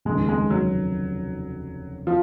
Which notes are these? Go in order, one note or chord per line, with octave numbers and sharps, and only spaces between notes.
F1 D#2 C#3 G#3
G#3
F#3
F3